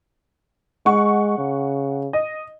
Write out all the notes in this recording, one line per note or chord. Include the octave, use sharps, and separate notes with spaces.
G#3 F#5 C#6
C#3
D#5